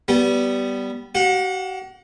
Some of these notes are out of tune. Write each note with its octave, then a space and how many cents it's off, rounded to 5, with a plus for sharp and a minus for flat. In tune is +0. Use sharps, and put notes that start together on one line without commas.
G3 -15 B3 +0
F#4 +45 F#5 -35